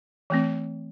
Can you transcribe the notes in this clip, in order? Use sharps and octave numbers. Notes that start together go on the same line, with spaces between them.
E3 A3 C4